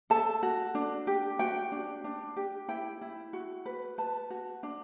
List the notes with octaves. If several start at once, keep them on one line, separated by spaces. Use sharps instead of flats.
A4 A5
F#4
D4
G4
F#4 G5
D4
D4
G4
E4 G5
E4
F#4
B4
B4 A5
F#4
D4